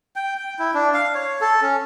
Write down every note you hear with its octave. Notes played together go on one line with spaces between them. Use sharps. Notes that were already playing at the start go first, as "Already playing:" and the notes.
G5
G5
E4
D4
F5
C#5
A4
C#4